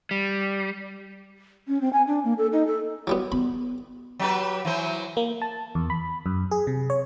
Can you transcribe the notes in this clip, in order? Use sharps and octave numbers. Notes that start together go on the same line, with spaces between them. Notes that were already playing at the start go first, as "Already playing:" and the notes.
G3
C#4
C4
G#5
D4
A#3
A4
D#4
A4
F#3 G3 B3
B3 B5
F#3 G4 B4
E3 F#3 C5
A#3
A5
E2
B5
F#2
G#4
C3
C#5